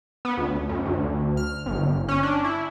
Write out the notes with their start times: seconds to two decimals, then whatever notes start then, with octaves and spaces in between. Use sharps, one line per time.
0.25 B3
0.37 D2
0.69 F#2
0.86 D2
1.37 F6
1.66 G1
2.09 C#4
2.23 D4
2.45 E4